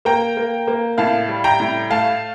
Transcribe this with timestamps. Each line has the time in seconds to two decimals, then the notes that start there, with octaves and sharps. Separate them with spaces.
0.05 A#3 G5 A#5
0.37 A#3
0.68 A#3
0.98 A2 F5 A5
1.28 G3
1.44 G5 A#5
1.60 A2
1.90 A3 F5 A5